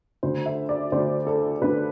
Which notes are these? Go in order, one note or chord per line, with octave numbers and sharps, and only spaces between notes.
D2 D3 C5
E5
D5
D2 D3 C5
A4
D2 D3 B4